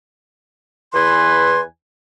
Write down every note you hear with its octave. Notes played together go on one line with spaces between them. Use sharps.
E2 E3 B4 G#5 C6